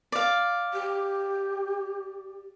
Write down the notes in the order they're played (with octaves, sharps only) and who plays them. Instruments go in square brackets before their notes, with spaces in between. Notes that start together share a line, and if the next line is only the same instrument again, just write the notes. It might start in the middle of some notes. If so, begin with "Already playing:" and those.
[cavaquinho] D5 F5
[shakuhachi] G4